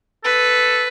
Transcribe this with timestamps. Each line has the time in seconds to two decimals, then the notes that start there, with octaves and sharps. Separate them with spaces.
0.24 A4 B4